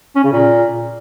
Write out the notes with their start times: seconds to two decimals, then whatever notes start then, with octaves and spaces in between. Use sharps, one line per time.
0.16 C#4
0.24 C#3
0.33 A#2